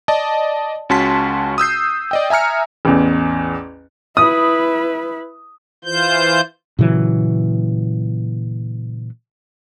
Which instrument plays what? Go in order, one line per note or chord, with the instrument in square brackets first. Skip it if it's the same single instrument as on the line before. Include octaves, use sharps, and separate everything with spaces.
[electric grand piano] D5 D#5 A5
C#2 C#4 F#4 A5 C6 B6
D#6 E6 G6 C7
D5 D#5 G5
E5 G#5 A#5 F6 C#7
[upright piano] A1 E2
[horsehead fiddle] E4 B4 [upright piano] D#6
[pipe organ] E3 F4 C5 G6
[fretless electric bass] A#2 C#3 E3 F#3